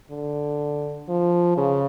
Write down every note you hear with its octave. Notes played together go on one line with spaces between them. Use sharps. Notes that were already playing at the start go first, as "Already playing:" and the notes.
D3
F3
C#3